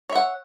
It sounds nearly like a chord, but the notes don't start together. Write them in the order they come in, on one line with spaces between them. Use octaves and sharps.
C#5 E5 F#5